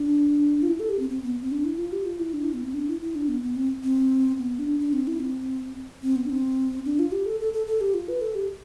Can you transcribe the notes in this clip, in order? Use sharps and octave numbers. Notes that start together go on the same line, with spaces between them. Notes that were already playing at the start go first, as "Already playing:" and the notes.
Already playing: D4
F4
E4
A4
G4
C4
C4
B3
C4
D4
E4
F4
G4
F4
E4
D4
E4
B3
C4
D4
E4
E4
D4
B3
B3
C4
C4
B3
D4
D4
C4
E4
C4
C4
B3
D4
C4
D4
F4
G4
A4
A4
A4
A4
G4
F4
B4
A4
G4